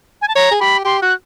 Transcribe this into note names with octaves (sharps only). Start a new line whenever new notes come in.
G#5
A5
C#5 A#5
G#4
G4 B5
G4 C6
F#4 F#6